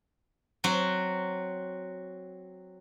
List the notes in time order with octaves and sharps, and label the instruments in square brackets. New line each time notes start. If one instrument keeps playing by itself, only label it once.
[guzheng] F#3 C4 F#4